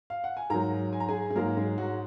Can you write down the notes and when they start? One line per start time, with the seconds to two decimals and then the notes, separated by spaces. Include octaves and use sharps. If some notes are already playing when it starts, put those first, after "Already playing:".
0.10 F5
0.24 F#5
0.37 G#5
0.50 G#2 F#3 A#4 A#5
0.93 G#5
1.00 A#5
1.09 G#4 G#5
1.30 G#4
1.35 G#2 F#3 A#3 A#4
1.57 G#3 G#4
1.78 F#3 F#4